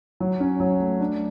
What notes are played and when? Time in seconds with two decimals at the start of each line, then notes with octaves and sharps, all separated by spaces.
0.20 F#3
0.40 C#4
0.60 F#3
0.80 A3
1.00 D4